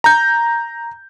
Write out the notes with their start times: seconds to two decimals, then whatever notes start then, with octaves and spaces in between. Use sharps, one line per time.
0.04 A#5 G6